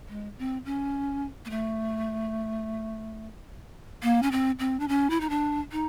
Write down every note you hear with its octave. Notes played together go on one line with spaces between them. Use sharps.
G#3
C4
C#4
A#3
A3
A#3
C#4
C4
C4
D4
C#4
E4
D#4
D4
D#4